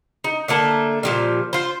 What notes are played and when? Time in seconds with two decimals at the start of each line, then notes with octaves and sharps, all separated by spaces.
0.24 D#4
0.48 D3 A3 A#3 A5
1.03 A#2 F3 G3
1.53 F4 C5